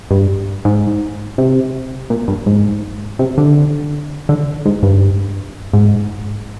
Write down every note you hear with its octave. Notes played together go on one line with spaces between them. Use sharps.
G2
G#2
C3
A#2
G2
G#2
C3
D3
D3
G#2
G2
G#2